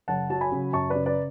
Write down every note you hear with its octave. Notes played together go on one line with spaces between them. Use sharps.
F#1 F#5 A5
F#3 A5
G#5 B5
C#3
F#2 A5 C#6
B4 D5
C#3
B4 D5